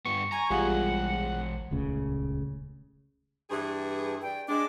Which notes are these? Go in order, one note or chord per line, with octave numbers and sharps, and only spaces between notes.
G2 B3 C#6
G#5 A#5
A#1 E3 G3 G#3 F4 G#4 F#5
D#1 C#2 C#3 A3
G2 E3 G#4
D5 G5
G#3 D4 D#5 D6